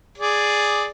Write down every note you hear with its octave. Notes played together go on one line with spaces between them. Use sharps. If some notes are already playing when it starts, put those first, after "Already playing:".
G#4 D5